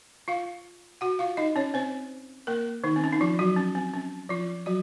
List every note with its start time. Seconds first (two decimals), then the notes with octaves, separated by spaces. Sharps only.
0.28 F4 F5
1.01 F#4 F#5
1.19 F4 F5
1.37 D#4 D#5
1.56 C#4 C#5
1.74 C4 C5
2.47 A#3 A#4
2.84 D#3 D#4
2.96 C4
3.04 C#4
3.13 D#4
3.21 F3 F4
3.39 F#3 F#4
3.56 C#4
3.75 C4
3.94 C#4
4.29 F3 F4
4.66 F#3 F#4